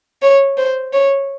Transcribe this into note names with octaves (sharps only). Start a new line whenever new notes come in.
C#5
C5
C#5